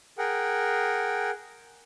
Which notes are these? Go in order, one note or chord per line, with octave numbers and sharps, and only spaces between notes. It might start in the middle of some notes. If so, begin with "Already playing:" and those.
G#4 A#4 F#5 G5